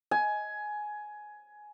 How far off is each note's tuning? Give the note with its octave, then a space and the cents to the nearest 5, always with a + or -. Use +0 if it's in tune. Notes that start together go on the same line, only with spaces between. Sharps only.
G#5 +15